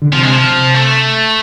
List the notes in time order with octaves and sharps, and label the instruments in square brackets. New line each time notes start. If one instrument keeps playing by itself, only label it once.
[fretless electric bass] D3
[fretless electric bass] C3 [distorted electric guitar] F3
[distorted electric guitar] G#3
F3
[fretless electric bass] C3
[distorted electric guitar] A3